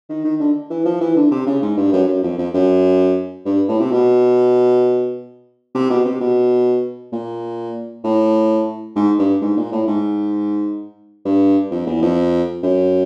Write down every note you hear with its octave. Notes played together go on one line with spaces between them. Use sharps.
D#3
D#3
D3
E3
F3
E3
D3
C3
C#3
G#2
G2
F#2
F#2
F2
F2
F#2
G2
A2
C3
B2
C3
B2
C3
B2
A#2
A2
G#2
G2
G#2
A#2
A2
G#2
G2
F2
E2
F2
F#2